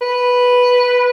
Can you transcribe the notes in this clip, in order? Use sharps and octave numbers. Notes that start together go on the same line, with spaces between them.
B4